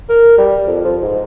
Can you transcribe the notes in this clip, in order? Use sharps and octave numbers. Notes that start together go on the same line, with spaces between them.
A#4
G3
F2
F3
G#2